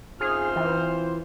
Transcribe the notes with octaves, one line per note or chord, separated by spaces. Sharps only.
F#2 C4 D#4 F4 G#4 C5 F6
E3